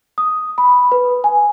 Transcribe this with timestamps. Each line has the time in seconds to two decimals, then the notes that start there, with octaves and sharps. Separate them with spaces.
0.18 D#6
0.58 B5
0.92 B4
1.24 G#5